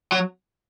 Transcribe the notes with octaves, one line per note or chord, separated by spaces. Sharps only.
F#3